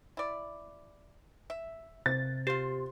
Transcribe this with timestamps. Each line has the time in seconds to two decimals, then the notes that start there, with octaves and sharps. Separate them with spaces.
0.17 E4 D5
1.50 E5
2.06 C3 A6
2.47 F4 G4 C5